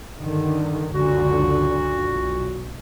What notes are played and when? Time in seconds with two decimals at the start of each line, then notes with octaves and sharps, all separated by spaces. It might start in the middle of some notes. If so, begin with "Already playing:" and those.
0.17 G2 D3 D#3
0.94 C#2 F#2 A#2 D3 F#4
2.04 B1